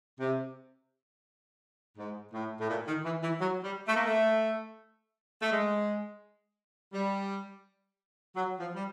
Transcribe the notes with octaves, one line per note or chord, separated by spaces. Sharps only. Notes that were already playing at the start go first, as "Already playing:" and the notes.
C3
G#2
A2
A2
A#2
D#3
E3
E3
F#3
G3
A3
A#3
A3
A3
G#3
G3
F#3
F3
G3